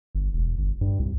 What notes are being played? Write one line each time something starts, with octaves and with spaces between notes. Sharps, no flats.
G1
E1
G1
G2
C2